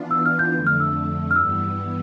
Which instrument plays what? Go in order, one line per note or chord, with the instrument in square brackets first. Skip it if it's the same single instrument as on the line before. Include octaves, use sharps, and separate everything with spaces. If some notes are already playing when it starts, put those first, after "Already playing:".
Already playing: [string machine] E3 B3 D4 F4
[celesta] E6
F6
G6
[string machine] F2 D3 A3 [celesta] G6
[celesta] F6
E6
F6
[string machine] G2 E3 G3 B3 [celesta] E6